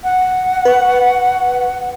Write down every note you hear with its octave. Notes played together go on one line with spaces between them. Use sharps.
F#5
B4 C#6